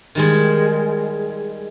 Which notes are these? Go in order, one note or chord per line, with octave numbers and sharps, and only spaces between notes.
D#3 G3 G#3